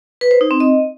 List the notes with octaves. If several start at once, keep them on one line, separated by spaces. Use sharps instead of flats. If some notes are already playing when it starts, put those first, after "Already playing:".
B4
C5
D#4
C4
D#5